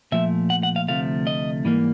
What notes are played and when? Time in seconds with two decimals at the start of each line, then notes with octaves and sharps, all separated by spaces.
0.12 A#2 F3 A3 E5
0.50 F#5
0.63 F#5
0.76 F5
0.88 D2 C3 F3 A3 F5
1.27 D#5
1.65 G#2 E3 G3 A#3